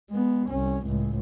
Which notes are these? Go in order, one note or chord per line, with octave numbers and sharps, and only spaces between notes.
G#3 B3
C2 C#4
C#2 A2